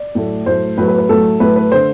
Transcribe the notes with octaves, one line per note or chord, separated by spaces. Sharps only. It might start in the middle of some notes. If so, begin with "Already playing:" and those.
Already playing: D5
A2 F#3 A3
A2 F#3 A3 C5
A2 F#3 A3 B4
B4
B4
A2 F#3 A3 A4
A2 F#3 A3 B4
B4
D3 A3 C5